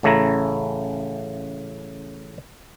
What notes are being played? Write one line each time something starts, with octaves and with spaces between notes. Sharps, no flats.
A1 C#3 A3 E4 A#5